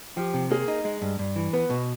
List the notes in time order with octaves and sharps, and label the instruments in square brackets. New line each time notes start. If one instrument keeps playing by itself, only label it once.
[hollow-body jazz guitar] F3 [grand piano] G4
[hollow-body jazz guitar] C3
[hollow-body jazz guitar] A#3 [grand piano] G#4
[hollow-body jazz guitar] D#4
G#3
G2
G2
E3
[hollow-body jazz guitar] B3 [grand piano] B4
[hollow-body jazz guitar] B2